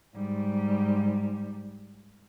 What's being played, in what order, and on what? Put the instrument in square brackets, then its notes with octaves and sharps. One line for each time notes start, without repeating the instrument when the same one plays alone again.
[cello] G#2 G3